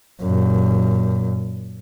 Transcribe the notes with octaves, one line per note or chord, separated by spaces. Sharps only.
F#2 A#2